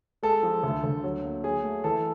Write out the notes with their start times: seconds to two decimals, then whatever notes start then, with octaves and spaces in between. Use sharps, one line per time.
0.23 G#3 A4
0.43 F3
0.63 D2
0.84 D2
1.04 F#3
1.24 A#3
1.44 F#3 G#4
1.64 A3
1.84 E3 A4